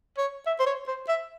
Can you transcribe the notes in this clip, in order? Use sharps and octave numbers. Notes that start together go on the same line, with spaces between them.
C#5
E5
C5
C#5
C5
E5